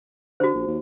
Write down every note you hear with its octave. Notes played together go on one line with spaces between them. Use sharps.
D3 F#4 C5
A#1
D#2